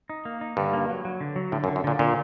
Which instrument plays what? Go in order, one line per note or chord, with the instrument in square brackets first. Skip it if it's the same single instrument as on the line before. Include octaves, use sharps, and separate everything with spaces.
[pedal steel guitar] D#4
A#3
D#4
[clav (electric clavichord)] G2 [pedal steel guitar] D3
[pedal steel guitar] A#3
F#3
F#3
D3
F#3
[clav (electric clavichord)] A2 [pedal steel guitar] D3
[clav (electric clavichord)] F#2
[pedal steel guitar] D3
[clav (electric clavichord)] F#2
[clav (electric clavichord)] A#2 [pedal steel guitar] D3
[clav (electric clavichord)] A#2 [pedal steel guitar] D3